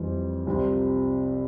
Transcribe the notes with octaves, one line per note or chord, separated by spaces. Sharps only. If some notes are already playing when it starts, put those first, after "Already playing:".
Already playing: F2 E3 G3 C4
C2 C3 F3 C4 F4